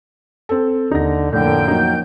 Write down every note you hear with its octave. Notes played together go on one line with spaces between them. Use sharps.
C4 A4
D#2 D3 D#4 A#6
F2 A2 D3 A#3 G5 G6
F#3 D#4